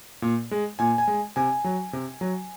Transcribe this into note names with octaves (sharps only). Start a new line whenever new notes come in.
A#2
G#3
A#2 G#5
G#5
G#3
C3 G#5
F#3
C3
F#3